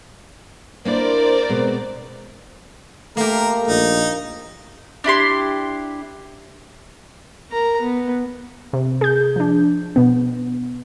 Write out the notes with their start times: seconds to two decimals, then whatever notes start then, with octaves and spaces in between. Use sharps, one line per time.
0.85 A#3 D4 E4 A#4 C5 D5
1.49 B2 G#3 C4
3.17 A3 A#3 G4 A#4
3.68 A#1 D#4
5.04 D4 E4 G4 C6
7.51 A#4 A#5
7.81 B3
8.73 C3
9.01 G#4 G6
9.36 F3 D4
9.96 B2 B3